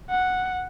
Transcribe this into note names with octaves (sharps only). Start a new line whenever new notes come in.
F#5